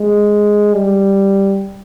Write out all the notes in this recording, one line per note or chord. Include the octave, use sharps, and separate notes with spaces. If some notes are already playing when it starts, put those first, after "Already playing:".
Already playing: G#3
G3